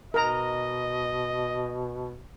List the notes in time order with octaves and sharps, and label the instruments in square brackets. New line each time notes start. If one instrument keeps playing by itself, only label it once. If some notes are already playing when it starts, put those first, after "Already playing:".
[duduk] B2 [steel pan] A#4 A#5 [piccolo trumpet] D#5